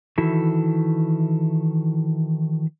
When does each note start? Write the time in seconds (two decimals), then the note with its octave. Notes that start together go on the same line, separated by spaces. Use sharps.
0.18 D#3 E3 E4 F#4 A4